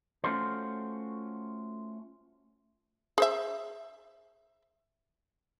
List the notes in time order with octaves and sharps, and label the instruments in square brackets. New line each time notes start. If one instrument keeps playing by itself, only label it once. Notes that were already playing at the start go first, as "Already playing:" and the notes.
[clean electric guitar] A3 C#4 F4 F#4 A4 C5
[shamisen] G#4 C5 E5